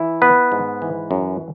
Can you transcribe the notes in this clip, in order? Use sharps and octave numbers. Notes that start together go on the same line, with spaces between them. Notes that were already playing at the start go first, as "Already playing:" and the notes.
Already playing: E3 E4
B3 B4
G#2
E3
F#2